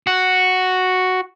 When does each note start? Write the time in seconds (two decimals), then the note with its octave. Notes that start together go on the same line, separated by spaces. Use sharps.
0.07 F#4